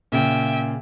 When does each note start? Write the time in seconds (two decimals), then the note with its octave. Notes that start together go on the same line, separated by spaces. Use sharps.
0.12 A#2 C#3 E5 G5